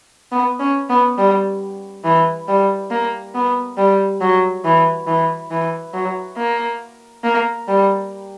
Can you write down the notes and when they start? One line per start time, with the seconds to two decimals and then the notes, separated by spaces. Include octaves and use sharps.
0.32 B3
0.59 C#4
0.89 B3
1.18 G3
2.04 E3
2.48 G3
2.91 A#3
3.35 B3
3.77 G3
4.21 F#3
4.65 E3
5.07 E3
5.51 E3
5.94 F#3
6.37 A#3
7.24 A#3
7.68 G3